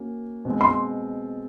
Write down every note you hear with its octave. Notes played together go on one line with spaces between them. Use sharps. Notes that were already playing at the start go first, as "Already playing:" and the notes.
Already playing: A#3 C#4 F#4
B2 G#3 C4
C6